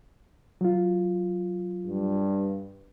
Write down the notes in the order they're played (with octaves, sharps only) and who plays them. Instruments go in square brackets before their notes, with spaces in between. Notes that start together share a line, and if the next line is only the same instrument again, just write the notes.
[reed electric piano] F#3 F4
[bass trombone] G2